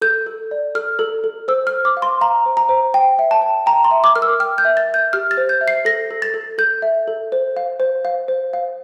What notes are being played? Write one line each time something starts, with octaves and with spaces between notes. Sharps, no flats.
A4 G6
A4
D5
A4 F6
A4
A4
C5 E6
C5 F6
D6
F5
C6
F5 A#5
C5
A#5
C5
G5
E5
A5
G5
G5 A#5
C6
E5
D6
A#4 F6
E6
G5 F6
G6
E5
A6
E5 G6
G4 F6
A6
C5
G6
E5
C7
A4 A#6
A4
A6
A4
A4 G6
E5
A4
C5
F5
C5
F5
C5
F5